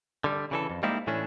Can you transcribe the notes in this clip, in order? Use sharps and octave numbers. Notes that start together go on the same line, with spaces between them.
D3 G3
C#3 E3 A4
F2
G3 G#3 A#3 C4 D#4 E4
A2 E3 A3 C#4 D4